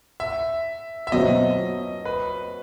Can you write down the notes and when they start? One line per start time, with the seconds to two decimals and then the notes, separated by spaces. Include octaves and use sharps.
0.20 E5
1.07 E5
1.12 B2 F#3 C4 D#5
2.05 B4